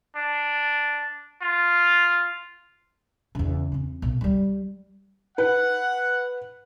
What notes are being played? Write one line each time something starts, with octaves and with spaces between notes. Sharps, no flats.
D4
F4
E2 C#3
E2 C4
B1
F#3 G3
B4 F#5